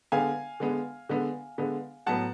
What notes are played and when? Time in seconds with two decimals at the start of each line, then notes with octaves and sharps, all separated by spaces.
0.12 D3 G#3 B3 F5 G#5
0.60 D3 G#3 B3
1.09 D3 G#3 B3
1.58 D3 G#3 B3
2.06 A2 F#3 B3 F#5 A5